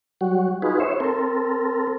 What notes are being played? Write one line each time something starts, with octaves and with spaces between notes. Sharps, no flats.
F#3 G3 F#4
D#4 F4 F#4 G#4 B4
C5 C#5 E5
C4 A4 A#4